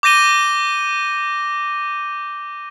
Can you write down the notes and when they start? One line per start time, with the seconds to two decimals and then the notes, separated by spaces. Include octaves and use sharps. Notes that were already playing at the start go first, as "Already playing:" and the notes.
0.03 D6 G6 A#6 D#7 G7